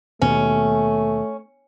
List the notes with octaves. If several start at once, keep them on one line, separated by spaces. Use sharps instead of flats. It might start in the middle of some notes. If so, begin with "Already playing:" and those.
D#2 B2 A3 C#4